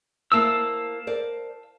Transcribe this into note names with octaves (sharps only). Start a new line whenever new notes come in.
A#3 E4 C5 F5 A5 E6
A#4 C5 D5